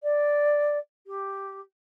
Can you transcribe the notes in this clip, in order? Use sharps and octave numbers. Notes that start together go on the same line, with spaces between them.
D5
G4